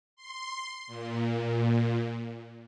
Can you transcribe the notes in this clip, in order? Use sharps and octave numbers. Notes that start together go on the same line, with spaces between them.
C6
A#2